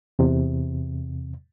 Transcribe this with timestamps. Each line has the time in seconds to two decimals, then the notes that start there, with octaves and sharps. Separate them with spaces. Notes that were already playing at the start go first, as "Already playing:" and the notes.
0.19 E2 C3